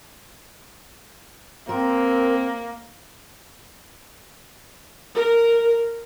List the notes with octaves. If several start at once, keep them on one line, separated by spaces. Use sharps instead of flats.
A#3 C4 A#4
A#4